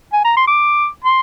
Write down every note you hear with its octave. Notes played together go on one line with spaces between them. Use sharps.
G#5
A#5
C6
D6
C6